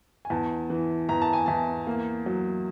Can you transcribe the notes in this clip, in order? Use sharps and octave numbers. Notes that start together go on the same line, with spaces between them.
G#5
E2 A5
E3
E2 A#5
A5
G#5
E2 A5
A#3
F#3